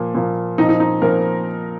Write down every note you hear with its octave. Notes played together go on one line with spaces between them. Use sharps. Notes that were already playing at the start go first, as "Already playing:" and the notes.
Already playing: A#2 F3 A#3
A#2 F3 A#3
A#2 F3 C4 D#4
D#4
D#4
A#2 F3 C4 A#4